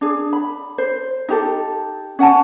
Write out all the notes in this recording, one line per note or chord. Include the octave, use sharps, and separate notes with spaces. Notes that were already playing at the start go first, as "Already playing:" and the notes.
D4 G#4
B5
C5
D#4 G4 A4
C#4 F#5 G#5 A5